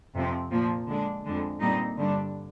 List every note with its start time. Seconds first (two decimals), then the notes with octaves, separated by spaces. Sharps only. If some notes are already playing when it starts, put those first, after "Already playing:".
0.14 F2 C3 F3 C4
0.50 A#2 F3 A#3
0.87 D3 G#3 D4
1.24 F2 D3 G#3
1.60 A#2 G3 C4 D#4
1.97 G2 D3 G3 D4